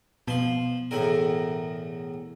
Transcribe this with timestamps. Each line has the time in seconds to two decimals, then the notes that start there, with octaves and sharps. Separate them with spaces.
0.28 B2 F3 C6
0.91 E2 A2 A#4